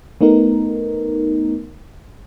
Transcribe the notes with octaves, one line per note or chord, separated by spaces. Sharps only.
A3 B3 D#4 A#4